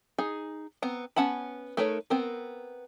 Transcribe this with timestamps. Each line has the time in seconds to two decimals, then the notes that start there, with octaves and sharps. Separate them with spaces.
0.19 D#4 G#4
0.82 B3 C4 A#5
1.16 B3 C#4 F#5 A5 B5
1.77 A3 D#4 A#4 B4 C#5
2.10 B3 C4 A#4